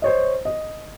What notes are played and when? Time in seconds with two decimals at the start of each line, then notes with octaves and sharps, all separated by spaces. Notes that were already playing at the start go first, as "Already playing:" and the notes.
0.02 C5 C#5 D#5
0.45 D#5